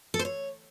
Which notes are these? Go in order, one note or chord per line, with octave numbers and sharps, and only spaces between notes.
A4
C5
C#5